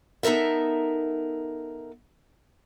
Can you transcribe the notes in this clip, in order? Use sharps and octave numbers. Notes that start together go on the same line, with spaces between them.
B3 D#4 A4 A#4 E5